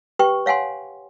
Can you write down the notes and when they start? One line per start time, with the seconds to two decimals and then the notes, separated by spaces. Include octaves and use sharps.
0.19 G4 B4 G5 C#6
0.46 C#5 F5 F#5 G#5 C6